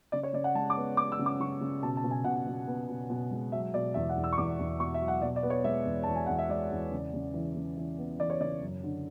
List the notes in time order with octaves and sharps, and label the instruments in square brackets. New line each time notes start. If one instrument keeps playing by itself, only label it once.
[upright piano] C#3 D5
C#5
C#3 D5
F#5
G#3 A5
D6
B3
B3 D6
E6
C#3
D6
C#3 C#6
C#3
B2 A5
A5
B2
G#5
B2 F#5
B2
B3
B2
B2
G#3
F#3 E5
B2 D5
E2 E5
F#5
E2
E6
C#6
E2 D6
E2
B2 C#6
E5
F#3
F#5
B2 D5
D5
B3
C#5
G#3 E5
E2
E2 A5
G#5
E2 F#5
E5
G#3 D5
E2
C#3
C#3
E3
C#3
E3
B3
E3 D5
C#5
C#3 D5
F#2
D3